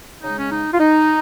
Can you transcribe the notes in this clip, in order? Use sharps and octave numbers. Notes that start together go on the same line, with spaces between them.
C#3 G#3 D#4
C#4
D#4
F4
D#4